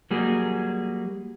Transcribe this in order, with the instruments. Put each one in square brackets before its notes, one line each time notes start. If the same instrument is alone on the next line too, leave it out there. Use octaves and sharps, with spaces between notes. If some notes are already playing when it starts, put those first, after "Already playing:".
[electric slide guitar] F#3 G3 A#3 F#4 G#4